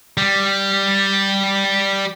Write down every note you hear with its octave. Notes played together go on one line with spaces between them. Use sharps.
G3